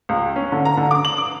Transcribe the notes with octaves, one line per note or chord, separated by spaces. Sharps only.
C#2
C#4
D3
A#5
D3
D6
F#7
D6